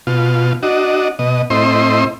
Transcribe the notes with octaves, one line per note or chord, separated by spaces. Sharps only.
B2 F4
D4 F#4 D#5
B2 D#5
A2 C4 E4 C5 D#5 C6